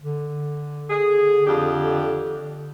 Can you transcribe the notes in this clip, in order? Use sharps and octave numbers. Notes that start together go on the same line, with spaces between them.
D3
G#4
F2 D4 G4